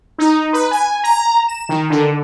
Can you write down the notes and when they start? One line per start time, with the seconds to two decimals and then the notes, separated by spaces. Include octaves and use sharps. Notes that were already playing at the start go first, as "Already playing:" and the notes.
0.18 D#4
0.53 B4
0.71 G#5
1.03 A#5
1.48 E7
1.69 D#3
1.90 D3